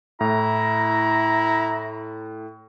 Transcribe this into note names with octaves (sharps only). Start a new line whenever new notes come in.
A2 E4 A#5